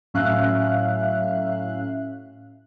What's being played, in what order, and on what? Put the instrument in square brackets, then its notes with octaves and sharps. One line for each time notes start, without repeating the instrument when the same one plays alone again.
[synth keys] A2 F#3 C#4 E5 F5 F#6